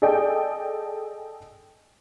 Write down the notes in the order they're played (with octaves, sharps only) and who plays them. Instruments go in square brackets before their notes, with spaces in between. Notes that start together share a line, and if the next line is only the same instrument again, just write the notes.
[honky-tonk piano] G#4 A4 D5 D#5 G5 G#5